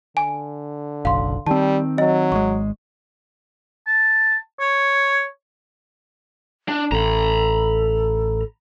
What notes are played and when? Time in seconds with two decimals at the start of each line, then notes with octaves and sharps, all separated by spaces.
0.17 D3 G#5
1.05 F#1 B1 F5 C6
1.47 D#3 G3 C4 A5
1.98 F#3 D#5
2.32 G#1 G#3 C#6
3.87 A5
4.60 C#5
6.69 D4
6.92 A1 A4 A#5 B5